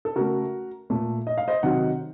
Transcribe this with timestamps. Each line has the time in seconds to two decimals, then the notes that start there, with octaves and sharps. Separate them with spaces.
0.05 A4
0.16 C#3 A3 F#4 A#4
0.90 A#2 A3
1.27 D#5
1.37 F5
1.48 C5 D#5
1.63 C3 D#3 F#3 D#5 F#5